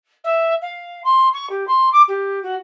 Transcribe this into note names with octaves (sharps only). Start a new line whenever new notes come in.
E5
F5
C6
C#6
G4
C6
D6
G4
F#4